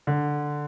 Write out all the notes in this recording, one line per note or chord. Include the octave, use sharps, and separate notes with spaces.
D3